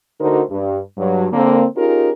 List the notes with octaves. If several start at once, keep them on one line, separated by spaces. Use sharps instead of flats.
D2 D3 D#4 F#4 A#4 C5
G2
G2 F#3
D3 A#3 C4
C#4 D#4 F4 G4 G#4 A#4